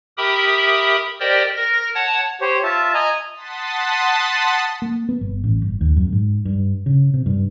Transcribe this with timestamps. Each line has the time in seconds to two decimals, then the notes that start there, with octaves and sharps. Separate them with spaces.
0.17 G4 A#4 E5 G5 B5 D#6
1.20 G4 A#4 C5 D5 D#5 G5
1.57 A#4 A#6
1.95 C#5 F#5 A5
2.41 G4 C5 C#5
2.63 F4 E5 A5
2.94 D#5 G#5 A#5
3.33 F#5 A5 C6 D#6 A6 B6
4.82 A#3
5.09 B3
5.21 G1
5.44 A1
5.62 G1
5.81 D#2
5.96 F#2
6.12 G#2
6.45 G2
6.86 C#3
7.14 C3
7.26 G2